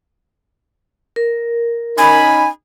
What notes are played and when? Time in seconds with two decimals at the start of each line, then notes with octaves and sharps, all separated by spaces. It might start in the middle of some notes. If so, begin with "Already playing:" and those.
1.16 A#4
1.98 C#4 D#4 G#5 B5